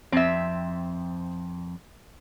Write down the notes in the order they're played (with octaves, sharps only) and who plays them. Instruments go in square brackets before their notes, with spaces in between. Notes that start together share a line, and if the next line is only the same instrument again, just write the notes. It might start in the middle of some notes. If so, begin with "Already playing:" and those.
[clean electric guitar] F2 [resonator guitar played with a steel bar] C4 E5